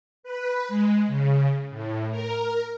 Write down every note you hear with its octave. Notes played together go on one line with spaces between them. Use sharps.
B4
G#3
C#3
A2
A#4